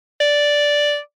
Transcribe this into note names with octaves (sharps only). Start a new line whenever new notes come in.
D5